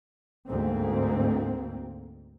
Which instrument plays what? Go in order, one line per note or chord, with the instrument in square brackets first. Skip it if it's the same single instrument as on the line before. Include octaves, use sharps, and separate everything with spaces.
[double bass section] D2 G#2 A#3 C4